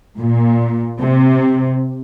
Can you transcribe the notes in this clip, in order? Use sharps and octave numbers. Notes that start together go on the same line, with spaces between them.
A#2
C3